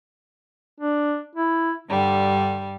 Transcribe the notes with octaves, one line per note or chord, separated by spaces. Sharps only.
D4
E4
G2 D3 G3